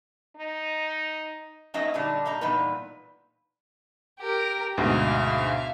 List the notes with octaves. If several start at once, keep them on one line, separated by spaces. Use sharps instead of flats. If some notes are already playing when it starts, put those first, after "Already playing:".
D#4
F#3 A#3 C#4 D#4 D#5 E5
A#2 D3 G3 D4 D#4
A#2 G3 D#5 A#5
A#2 E3 G3 B3 D#4 B4
G4 A#4
D2 G#2 B2 E5 F5